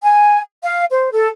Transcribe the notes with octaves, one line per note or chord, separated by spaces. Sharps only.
G#5
F5
C5
A4